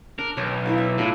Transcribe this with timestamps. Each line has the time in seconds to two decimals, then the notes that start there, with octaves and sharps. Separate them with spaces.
0.19 D4 A#4
0.37 B1 C#5 A#5
0.65 E4 A#4 F5
0.78 E5
0.98 A2 D4 F4 A4